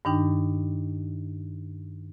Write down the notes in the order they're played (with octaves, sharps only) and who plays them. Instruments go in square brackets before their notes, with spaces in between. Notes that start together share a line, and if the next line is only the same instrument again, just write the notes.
[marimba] G2 D#3 D4 D#4 G5